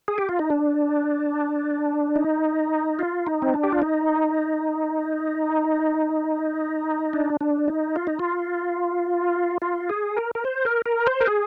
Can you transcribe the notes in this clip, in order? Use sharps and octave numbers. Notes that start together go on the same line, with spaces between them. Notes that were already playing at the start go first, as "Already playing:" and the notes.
G#4
G4
F4
D#4
D4
D#4
F4
D#4
C4
D4
G4
F4
D#4
D4
D4
D#4
F4
D#4
F4
F4
G#4
A#4
A#4
C5
A#4
A#4
C5
A#4
G#4